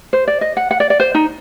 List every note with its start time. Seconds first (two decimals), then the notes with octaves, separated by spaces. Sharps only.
0.13 C5
0.28 D5
0.41 D#5
0.57 F#5
0.71 F#5
0.80 D5
0.90 D5
1.00 C5
1.15 D#4